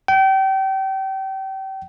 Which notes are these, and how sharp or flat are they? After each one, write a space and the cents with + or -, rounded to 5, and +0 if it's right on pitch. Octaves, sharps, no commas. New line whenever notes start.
G5 -30